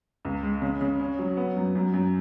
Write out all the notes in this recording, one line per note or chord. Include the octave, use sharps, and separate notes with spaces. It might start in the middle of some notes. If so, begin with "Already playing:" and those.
C#2
G#3
C#3
C#3
C#4
F#3
B3
F#2
F#2
F#2